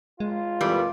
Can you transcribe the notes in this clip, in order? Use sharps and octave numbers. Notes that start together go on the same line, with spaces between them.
G#1 G#3 F4
F2 A#2 E3 G3